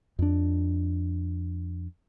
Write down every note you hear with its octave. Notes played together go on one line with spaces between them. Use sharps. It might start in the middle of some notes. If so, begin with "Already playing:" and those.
F2 D4